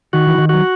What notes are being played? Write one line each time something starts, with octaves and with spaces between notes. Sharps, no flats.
D#3 F#4
E3
D#3
F#3 F#4